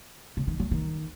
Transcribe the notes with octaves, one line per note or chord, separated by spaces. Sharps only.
C#3
D#3
F#3
D#3